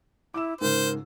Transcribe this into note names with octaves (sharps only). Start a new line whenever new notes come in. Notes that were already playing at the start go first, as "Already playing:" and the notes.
E4 D6 E6 E7
C#2 G#2 A#4 C5